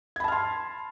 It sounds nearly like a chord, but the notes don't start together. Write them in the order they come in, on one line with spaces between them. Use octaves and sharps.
G#6 B5 A5 F6 C6